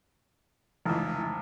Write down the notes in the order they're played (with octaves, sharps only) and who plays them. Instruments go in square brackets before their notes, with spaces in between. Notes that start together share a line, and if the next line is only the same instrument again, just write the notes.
[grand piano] F1 C#2 [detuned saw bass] E3